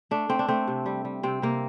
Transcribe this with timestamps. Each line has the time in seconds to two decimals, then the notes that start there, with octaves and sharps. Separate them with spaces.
0.11 A3 D4
0.29 A3 C4
0.39 D4
0.48 A3 C4
0.68 C3
0.86 G3
1.05 G3
1.23 C3 C4
1.42 C3 A#3